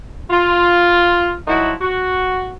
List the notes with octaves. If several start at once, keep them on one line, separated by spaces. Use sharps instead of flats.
F4
F3 F#3 D#4 E4 F#4
F#4